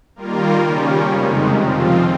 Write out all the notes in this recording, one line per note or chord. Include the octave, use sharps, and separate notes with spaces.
D#3 G3 A#3 F4 A#4
C#3 G3 C#4
F2 C3 D#3 G#3
F3 C4 F4